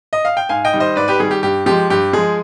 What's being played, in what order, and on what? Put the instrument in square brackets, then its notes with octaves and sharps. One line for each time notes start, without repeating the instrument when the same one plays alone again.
[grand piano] D#5
F5
G5
G#2 F5 G#5
D#5 G5
D#3 G3
C5 D#5
G#2 B4 D5
G4 B4
D#3 G3 G#4
G4
G2 G4
F3 G#3 G4
G2 G4
F3 G#3 G#4